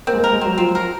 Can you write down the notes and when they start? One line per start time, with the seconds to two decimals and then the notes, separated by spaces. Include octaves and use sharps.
0.07 A#3 C4
0.14 G#3
0.19 A#3
0.24 A#4
0.33 G#3
0.41 F#3 C4
0.58 F3 C4
0.75 A#4